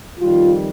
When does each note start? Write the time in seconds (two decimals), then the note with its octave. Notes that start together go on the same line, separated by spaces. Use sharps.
0.20 F2 D#3 G3 F4